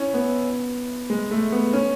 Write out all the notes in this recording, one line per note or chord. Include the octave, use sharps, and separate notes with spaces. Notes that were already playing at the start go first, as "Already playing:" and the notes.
Already playing: C#4 E4
B3
G#3
A3
B3
C#4